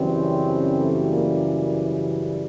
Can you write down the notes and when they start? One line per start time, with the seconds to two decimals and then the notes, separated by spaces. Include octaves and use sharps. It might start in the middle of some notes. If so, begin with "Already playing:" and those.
Already playing: F#2 C#3 E3 G3 C4
0.78 A3
1.09 A#3